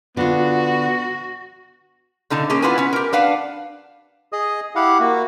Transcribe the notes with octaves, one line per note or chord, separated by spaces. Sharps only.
D3 B3 F4 F#4
A#2 D3 D#4 A5
A#3 C#4 G#4
B3 E4 F4 B4 G#5
B3 C#4
G4 A#4
D4 B4 F5 F#5
G#4 D#5 D#6
E4 G4 F5 F#5
A#3 F#4